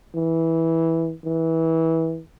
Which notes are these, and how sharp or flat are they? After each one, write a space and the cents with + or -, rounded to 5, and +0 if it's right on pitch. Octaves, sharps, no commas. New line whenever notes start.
E3 -10
E3 -20